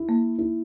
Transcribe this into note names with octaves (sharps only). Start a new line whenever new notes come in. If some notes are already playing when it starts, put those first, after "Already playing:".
Already playing: E4
A#3
E4